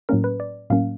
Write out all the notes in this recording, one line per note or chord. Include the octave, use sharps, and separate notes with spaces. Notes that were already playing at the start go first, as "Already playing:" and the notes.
A2 F#3 A#3 C#4 A#4
B4
D5
A2 F#3 A#3 C#4 F5